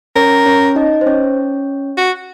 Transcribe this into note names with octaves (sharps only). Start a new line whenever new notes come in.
C#4 A#4 C#5
C#4 C#5
D#4 D#5
C5
C#4 C#5
F#4